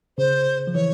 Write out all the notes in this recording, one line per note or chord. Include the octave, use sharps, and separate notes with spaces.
C#3 C5
F3
E3 C#5